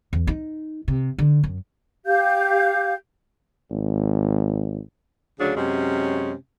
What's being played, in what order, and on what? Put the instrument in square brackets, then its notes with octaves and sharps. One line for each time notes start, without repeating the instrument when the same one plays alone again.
[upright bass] E2
D#4
C3
D3
F#2
[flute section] G4 F5 G6
[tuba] G#1
[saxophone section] D2 C#3 F#3 D4 G#4
F#2 C3 G#3 C#4